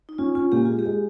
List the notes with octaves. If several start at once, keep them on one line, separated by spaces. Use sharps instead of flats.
D#4
C#4 F4
C#4 F4
A#2 G4
G#3 F4
G4
G#3